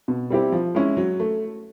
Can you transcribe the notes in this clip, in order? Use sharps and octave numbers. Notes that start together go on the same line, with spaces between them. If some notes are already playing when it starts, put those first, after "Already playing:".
B2
G3 C4 E4 G4
F3
G#3 C#4 E4
F#3
A3